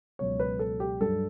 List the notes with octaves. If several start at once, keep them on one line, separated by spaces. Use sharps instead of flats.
C#2 B2 F#3 C#5
B4
A4
G4
G2 F#3 A4